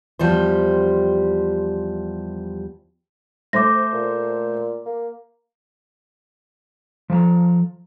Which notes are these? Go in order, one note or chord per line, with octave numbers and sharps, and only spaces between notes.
E2 F3 G3 G4 C5
A3 C5 D6 A#6
A#2
A#3
F3 A4 A5 A#5